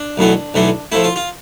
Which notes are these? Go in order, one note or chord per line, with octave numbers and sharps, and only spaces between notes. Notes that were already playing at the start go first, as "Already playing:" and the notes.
Already playing: D4
B1 A2 E3 B3
B1 A2 E3 B3
A2 F3 A3 E4
F4
F4